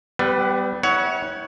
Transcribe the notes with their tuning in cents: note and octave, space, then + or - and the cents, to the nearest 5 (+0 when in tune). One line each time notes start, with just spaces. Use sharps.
G3 +0 B3 +35 B4 +0
E4 -35 C#5 +15 F#5 +0